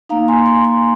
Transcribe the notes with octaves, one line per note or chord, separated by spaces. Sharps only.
A#3 D#4 F5 A#5
G#5 C6
G#5 C6
G#5 C6